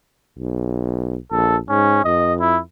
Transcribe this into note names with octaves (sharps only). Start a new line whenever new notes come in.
B1
A#1 A4
G#2 C#4
F2 D#5
E4